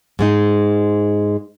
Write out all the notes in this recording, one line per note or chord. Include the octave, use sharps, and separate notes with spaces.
G#2 G#3 D#4